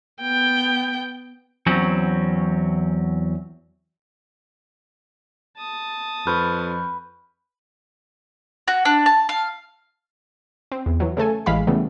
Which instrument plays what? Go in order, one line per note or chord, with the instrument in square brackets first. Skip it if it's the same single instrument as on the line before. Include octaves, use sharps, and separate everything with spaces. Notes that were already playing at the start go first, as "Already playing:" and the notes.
[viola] B3 G5
[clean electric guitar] E2 F#3 C4 C#4
[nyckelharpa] A5 D#6
[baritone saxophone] F2 [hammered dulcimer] B4 [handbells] C#6 F6 G6
[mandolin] F#4
D4
A5
F5
[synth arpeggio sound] C4
E2
E3 F#3
C#3 A3 A4 G#5
A1 E3 G#3 F5 B5 B6
C#3 E3 G3 A3 B3